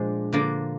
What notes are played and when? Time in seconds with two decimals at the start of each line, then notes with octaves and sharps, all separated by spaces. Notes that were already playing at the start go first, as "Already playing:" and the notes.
Already playing: A#2 F3 G#3 D4 C5
0.33 D3 F3 A#3 D4